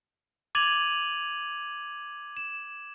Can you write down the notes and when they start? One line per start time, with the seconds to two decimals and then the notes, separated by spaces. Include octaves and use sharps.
0.55 D6 G#6 A6 D#7 F7 F#7
2.37 E7